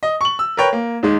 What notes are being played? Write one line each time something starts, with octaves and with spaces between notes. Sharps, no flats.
D#5
C#6 F#7
E6
A#4 B4 C#5 G5
A#3
D#2 D#3 G#3